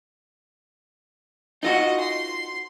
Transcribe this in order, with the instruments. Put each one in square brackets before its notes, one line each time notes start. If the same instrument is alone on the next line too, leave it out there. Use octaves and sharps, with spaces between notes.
[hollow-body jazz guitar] D#4 F4 F#4 [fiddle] D#5
[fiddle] C6